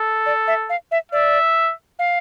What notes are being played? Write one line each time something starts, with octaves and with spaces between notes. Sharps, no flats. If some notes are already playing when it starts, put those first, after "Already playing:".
Already playing: A4
D5
E5
F5
E5
D5 E5
F5